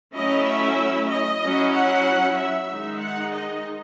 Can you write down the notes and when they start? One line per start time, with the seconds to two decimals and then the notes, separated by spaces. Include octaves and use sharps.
0.14 F#3 A3 C#4 E4 D#5
0.46 E5
1.09 D#5
1.42 F#3 C#4 E4
1.73 F#5
2.37 E5
2.69 D#3 G#3 D#4
3.00 F#5
3.32 D#5